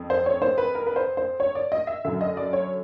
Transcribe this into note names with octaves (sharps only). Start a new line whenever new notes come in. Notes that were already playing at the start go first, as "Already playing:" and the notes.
Already playing: F2
C5
C#5
C5
B4
A#4
B4
C5
C5
C#5
D5
D#5
E5
F#2 D3 E5
D#5
D5
C#5